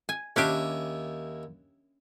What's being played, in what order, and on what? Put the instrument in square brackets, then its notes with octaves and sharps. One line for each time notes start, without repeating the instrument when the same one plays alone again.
[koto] G#5
[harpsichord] D#2 E4 G#5 [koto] C#4 D4 G4